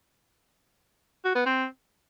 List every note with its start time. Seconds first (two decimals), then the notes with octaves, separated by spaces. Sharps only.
1.25 F#4
1.35 B3
1.46 C4